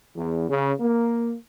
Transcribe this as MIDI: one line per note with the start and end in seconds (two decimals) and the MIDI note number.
0.15 0.44 40
0.49 0.73 49
0.80 1.34 58